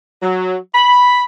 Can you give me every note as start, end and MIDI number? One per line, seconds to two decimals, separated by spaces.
0.23 0.56 54
0.75 1.23 83